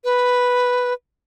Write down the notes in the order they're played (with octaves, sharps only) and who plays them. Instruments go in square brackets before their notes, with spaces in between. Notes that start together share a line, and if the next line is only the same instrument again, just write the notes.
[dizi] B4